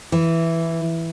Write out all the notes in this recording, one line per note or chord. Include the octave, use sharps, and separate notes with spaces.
E3